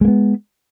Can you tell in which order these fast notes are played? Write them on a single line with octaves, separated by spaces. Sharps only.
G#3 A#3 B3